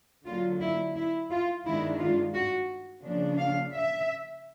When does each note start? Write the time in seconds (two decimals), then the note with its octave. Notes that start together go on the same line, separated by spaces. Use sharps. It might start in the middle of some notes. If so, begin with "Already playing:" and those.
0.25 D3 F#3 A#3 F4
0.60 E4
0.95 E4
1.30 F4
1.65 G2 D#3 G#3 B3 D4 E4
1.99 F4
2.34 F#4
3.04 C#3 F3 A#3 D4
3.38 F5
3.74 E5